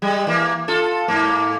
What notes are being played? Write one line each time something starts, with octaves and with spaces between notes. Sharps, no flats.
G3 G#3
E3 A#3
F4 A4
G#2 A#3